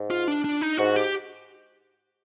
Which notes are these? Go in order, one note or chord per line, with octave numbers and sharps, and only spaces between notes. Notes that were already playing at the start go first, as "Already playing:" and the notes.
Already playing: G#2
F4
D4
D4
D#4
G#2 F#4
G4